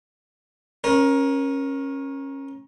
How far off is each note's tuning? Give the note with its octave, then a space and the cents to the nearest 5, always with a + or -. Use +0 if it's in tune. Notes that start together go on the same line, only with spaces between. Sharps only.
C#4 -20 A#4 +20